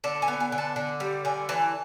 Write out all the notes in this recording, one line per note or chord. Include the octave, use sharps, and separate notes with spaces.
D3 A5
G#5
B3
G#5
D3
A5
D3
G3
D3 G#5
E3 A5